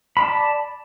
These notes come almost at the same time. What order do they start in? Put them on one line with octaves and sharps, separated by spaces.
B5 D5 A5